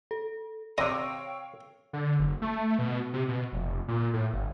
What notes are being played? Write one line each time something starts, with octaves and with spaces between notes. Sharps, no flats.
A4
C3 C4 C#5 D#5 F5 G5 E6
D3
F#1
A3
B2
C3
B2
F1
A#2
A2
G1